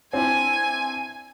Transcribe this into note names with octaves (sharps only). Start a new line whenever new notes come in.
C4 D4 E4 G#5